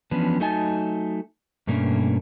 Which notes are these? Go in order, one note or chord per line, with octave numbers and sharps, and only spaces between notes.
E3 F3 B3 C#4 D4 B4
F#3 A3 D#4 D#5 G#5 A5
G2 B2 A3 A#3 C#4 D4